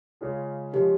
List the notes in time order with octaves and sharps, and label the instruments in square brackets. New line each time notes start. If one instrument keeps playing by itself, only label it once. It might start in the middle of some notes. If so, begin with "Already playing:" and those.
[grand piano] C#3 G#3 C#4 F4 G#4
[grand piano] F3 G#3 C#4 [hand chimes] G4